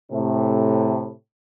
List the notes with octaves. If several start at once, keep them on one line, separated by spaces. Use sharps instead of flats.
A2 C3